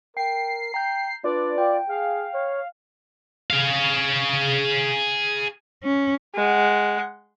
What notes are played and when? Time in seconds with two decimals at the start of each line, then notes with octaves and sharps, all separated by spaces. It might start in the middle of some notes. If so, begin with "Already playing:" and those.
0.17 A#4 G5 C7
0.74 G5 A#5 G6
1.24 D4 F4 B4 D5
1.58 F4 G5
1.89 G#4 F5
2.34 C#5
3.50 G#4 F5
5.84 C#4
6.35 G#3 F#5